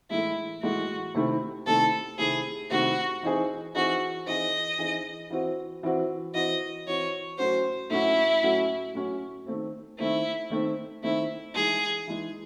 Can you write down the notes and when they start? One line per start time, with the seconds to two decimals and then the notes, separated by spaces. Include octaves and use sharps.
0.10 A2 E3 G#3 E4
0.62 A2 E3 G#3 F#4
1.15 C3 D#3 A3 C4 E4
1.66 C3 D#3 A3 C4 E4 A4
2.18 C3 D#3 A3 C4 E4 G#4
2.70 C3 D#3 A3 C4 E4 F#4
3.23 E3 C4 D#4 G#4
3.75 E3 C4 D#4 F#4 G#4
4.27 E3 C4 D#4 G#4 D#5
4.79 E3 C4 D#4 G#4
5.30 E3 C4 F#4
5.83 E3 C4 F#4
6.34 E3 C4 F#4 D#5
6.87 E3 C4 F#4 C#5
7.38 A2 F#3 C#4 F#4 C5
7.90 A2 F#3 C#4 E4 F#4
8.43 A2 F#3 C#4 F#4
8.95 A2 F#3 C#4 F#4
9.46 D#3 A3 C4
9.99 D#3 A3 C4 E4
10.50 D#3 A3 C4
11.03 D#3 A3 C4 E4
11.55 E3 G#3 D#4 G#4
12.07 E3 G#3 D#4